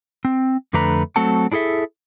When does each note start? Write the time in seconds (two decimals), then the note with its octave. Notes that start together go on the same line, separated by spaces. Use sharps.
0.25 C4
0.73 F2 D3 A3 D4 B4 A#5
1.16 F#3 A3 C4 A4 F#5 A5
1.52 D4 E4 G#4 A4 E5